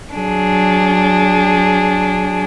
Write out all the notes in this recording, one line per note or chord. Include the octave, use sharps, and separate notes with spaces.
F#3 D4 G#4